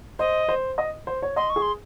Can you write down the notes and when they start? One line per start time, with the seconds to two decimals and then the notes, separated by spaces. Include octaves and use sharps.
0.19 C5 D#5
0.49 C5
0.78 D#5
1.07 C5
1.22 C#5
1.36 D#5 C6
1.50 C#6
1.56 G#4
1.62 C6